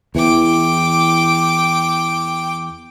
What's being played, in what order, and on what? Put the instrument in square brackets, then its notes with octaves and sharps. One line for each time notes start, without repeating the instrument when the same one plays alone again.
[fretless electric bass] E2 E3 [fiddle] G5 D6